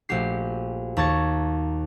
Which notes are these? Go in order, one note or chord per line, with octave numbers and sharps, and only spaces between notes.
A#1 A3 F#4 G4 C7
D#2 A5 A#5 C#6 G#6 A6